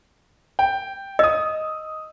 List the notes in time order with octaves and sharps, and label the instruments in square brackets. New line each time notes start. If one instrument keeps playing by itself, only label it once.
[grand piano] G5
[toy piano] D#5 [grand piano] D#6 E6